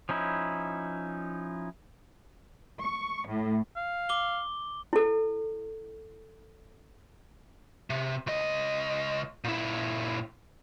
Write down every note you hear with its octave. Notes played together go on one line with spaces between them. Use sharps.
F3 C#4 D#4 E4
C#6
A2
F5
D6 G7
E4 A4
C3
C#2 D#5
A#2 E4